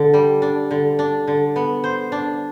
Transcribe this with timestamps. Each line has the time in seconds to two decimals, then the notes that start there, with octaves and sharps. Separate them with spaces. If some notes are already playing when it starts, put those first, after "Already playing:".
Already playing: D3 A4
0.14 G3
0.42 D4
0.71 D3
0.99 D4
1.27 D3
1.56 B3
1.84 C5
2.12 D4